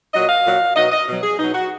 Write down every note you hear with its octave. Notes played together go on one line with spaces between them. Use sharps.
A#2 F#3 D#5
F5
A#2 F#3
B2 F#3 D#5
D#5
B2
F#3
G#4
B2 F#3 D#4
F#4